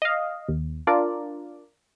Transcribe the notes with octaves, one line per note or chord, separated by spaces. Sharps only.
D#5 F5
D#2
D4 F4 A#4 D5